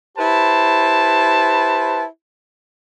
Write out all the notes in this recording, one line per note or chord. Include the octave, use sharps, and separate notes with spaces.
E4 G4 B4 C5 A5